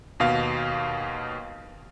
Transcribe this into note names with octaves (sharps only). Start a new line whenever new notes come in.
D#2 B2 F5